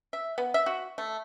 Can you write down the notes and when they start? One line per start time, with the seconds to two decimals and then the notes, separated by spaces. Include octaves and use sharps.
0.13 E5
0.38 B3
0.54 E5
0.66 F#4
0.98 A3